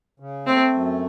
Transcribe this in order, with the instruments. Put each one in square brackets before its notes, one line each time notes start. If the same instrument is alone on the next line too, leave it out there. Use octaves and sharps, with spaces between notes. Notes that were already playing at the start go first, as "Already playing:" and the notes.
[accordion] C#3
[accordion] A3 [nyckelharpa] C4
[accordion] F#2